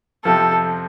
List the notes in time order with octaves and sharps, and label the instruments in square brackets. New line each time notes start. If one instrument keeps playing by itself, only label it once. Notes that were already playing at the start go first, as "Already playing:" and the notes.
[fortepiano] F2 C3 F3 [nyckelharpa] A4